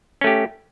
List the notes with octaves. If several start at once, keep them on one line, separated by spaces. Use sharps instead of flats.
A3 C#4 G4